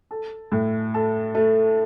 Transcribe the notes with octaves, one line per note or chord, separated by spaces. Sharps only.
A4
A2
A4
A3